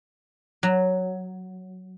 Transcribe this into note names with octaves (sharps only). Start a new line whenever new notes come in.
F#3